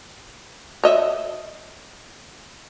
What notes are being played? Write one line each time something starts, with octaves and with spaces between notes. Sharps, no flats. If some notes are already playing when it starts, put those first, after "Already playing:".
C#5 D#5 E5